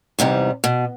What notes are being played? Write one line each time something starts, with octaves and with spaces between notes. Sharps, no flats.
E2 G#2 C3 G3
B2